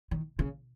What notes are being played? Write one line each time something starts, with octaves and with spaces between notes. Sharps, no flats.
D#3
C#3